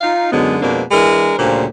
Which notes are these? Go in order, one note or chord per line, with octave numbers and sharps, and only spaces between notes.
D#4 F4 F5
F#2 D3 F#3 G#3 B3 D#4
F2 B2 G#3 A#3 C4 D4
E3 G#3 D4 A#4
D2 A#2 C#3 G3 C5